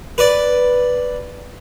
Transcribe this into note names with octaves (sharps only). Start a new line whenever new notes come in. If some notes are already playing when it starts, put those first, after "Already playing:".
B4 D5